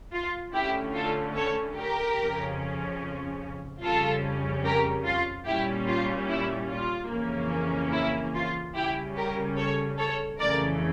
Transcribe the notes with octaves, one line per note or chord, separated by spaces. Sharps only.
F4
D3 A3 C#4 E4 G4
F4 A4
A4 C#5
G4 A#4
F2 C#3 F3 C#4
F2 C#3 G3 C#4 F4 A4
G4 A#4
F4
A#2 G3 C#4 E4 G4
F4
E4
F4
F2 C#3 E3 A#3 C#4
E4
F4
C#3 G3 C#4 E4 G4
G4 A#4
A4 C#5
A4 C#5
F2 C#3 E3 A3 A#4 D5